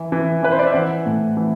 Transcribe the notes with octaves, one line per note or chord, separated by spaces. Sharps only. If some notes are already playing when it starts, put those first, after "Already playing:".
Already playing: E3
E3
E3 B4
C5
D5
E5
E3 F#5
A2
E3